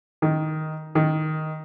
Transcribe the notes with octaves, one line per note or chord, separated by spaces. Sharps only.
D#3
D#3